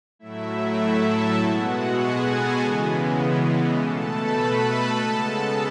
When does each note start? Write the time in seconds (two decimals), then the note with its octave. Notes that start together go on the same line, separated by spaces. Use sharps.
0.19 A2 F#3 A3 E4 E5
0.79 A4 A5
1.09 E4 E5
1.39 B2 G#3 B3 F#4 F#5
1.99 G#4 G#5
2.29 A4 A5
2.59 C#3 E3 G#3 B3
3.79 B2 A3 A4 A5
4.09 B4 B5
4.39 A4 A5
4.99 C#3 G#3 B3